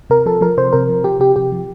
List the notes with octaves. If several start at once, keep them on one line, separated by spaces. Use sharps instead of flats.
C3 A#4
F3 A4
F3 A#4
C3 C5
C3 A#4
F3
F3 G4
C3 G4
C3 G4
F3